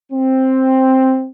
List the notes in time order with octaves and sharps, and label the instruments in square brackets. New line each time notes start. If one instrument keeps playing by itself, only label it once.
[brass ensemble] C4